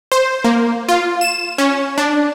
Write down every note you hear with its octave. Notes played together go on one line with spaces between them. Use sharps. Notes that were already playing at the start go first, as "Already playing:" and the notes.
C5
A#3
F4
E7
C#4
D4